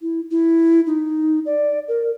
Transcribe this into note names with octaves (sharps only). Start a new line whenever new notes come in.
E4
E4
D#4
D5
A#4